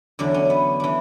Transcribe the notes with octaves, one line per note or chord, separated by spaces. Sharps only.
E2 D3 F#3 D4
C#4
B3
E3 D4